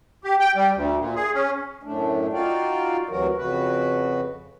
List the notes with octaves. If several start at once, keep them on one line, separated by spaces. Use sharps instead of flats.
G4
G5
G3
D2
A#2
G#4
C#4
F#2 A2 A3 D4
D#4 F4 F#4 D5 F5 G5
D2 C3 E3 F#3 F#4 A#4
F2 C#3 F#4 B4